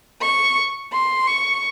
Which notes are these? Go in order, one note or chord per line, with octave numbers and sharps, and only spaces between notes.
C#6
C6
C#6